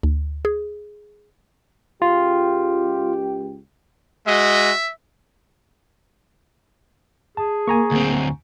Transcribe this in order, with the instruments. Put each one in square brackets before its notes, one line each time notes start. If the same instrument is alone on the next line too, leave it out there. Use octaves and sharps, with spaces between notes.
[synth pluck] D2
G#4
[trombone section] C#2 G4 [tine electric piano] F4
[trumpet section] G#3 F#4 D#5 [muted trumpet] E5
[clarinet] G#4 [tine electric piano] A5
[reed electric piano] A#3 [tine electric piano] G#5 A#5 C#6
[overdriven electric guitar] D2 C4